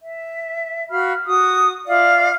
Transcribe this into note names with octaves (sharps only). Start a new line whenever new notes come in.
E5
F#4 F5 B5 F6
F#4 D#6
F4 D5 E5 F5